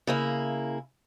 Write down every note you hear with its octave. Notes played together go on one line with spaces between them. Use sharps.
C#3 A#3 E4